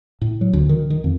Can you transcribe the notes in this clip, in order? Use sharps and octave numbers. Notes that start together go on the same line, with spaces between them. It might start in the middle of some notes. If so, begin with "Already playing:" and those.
A2
F#3
D2
D#3
D#3
F2